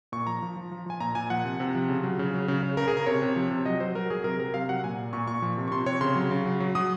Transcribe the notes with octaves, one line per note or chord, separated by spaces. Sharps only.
A#2 C#6
F3 A#5
F3
F3
F3
F3 G#5
A#2 A#5
A#2 G#5
F3 F#5
C3
C3
F3
C#3
F#3
C#3
F#3
C#3
C#3
C#3 A#4
G#4
C#3 A#4
C3 C#5
C3
F3
C3
F#3 D#5
F#3 C5
F#3 A#4
F#3 G#4
C3 A#4
F#3 A#4
C3 F5
F#3 F#5
A#2 G#5
A#2
A#2 C#6
A#2 C#6
F3
C3
C#6
C3 C6
C3 C#5
C#3 C6
F#3
C#3
F#3
F#3
F#3 D#6